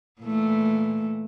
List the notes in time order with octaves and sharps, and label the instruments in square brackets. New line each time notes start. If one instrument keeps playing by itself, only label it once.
[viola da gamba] A#2 E3 A3